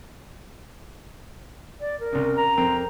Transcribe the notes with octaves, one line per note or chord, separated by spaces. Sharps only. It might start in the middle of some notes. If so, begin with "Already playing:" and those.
D5
A#4
C2 C#3
A#5
F2 C4 A#4